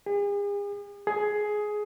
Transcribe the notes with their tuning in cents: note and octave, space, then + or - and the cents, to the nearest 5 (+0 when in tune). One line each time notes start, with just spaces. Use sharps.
G#4 -40
G#4 +15